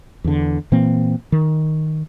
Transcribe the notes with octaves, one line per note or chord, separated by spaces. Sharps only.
E2 D3
A#2 E3 A#3 C4
D#3